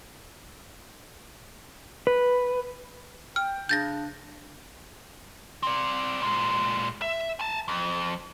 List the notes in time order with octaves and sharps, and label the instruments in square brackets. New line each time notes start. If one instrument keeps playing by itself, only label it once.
[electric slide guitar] B4
[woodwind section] G5 [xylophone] F6
[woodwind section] C#3 D4 [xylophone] G6 A6 A#6
[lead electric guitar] C4 D5
A#2 G#3
E5
G#5 A5
F2